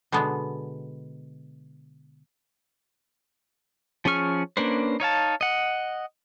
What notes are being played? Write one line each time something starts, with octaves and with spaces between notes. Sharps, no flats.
B2 D3 G#3 B3
F3 C#4 G#4 C#6 F6
A#3 C#4 D4 B4 C5
D#4 C#5 F5 A5
D#5 F#5